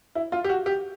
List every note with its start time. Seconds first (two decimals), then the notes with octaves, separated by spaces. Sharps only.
0.15 E4
0.32 F4
0.44 G4
0.49 F#4
0.66 G4